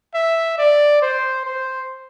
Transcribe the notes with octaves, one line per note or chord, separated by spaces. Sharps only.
E5
D5
C5
C5